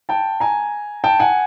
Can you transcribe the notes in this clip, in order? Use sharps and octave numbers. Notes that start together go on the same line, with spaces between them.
G5 A5
G#5 A#5
G5 A5
F#5 G#5